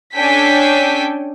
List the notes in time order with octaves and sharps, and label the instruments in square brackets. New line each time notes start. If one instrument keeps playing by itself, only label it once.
[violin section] C#4 D4 A4 G5 G#5 B6